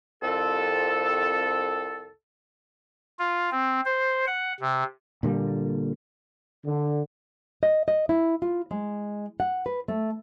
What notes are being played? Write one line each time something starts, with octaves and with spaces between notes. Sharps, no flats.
C2 F2 A4
F4
C4
C5
F#5
C3
A#2 D3 G3 A#3
D3
D#5
D#5
E4
F4
G#3
F#5
B4
A3